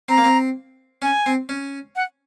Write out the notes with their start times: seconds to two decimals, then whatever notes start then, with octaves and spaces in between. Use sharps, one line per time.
0.09 C4 A#5
0.18 A#3
0.24 C4
1.02 C#4 G#5
1.26 C4
1.49 C#4
1.96 F#5